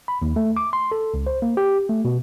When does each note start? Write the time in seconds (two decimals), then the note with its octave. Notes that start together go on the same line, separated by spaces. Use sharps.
0.08 B5
0.22 D#2
0.36 A3
0.57 D6
0.73 C6
0.92 A4
1.14 C#2
1.27 C5
1.42 A#3
1.57 G4
1.89 A3
2.05 B2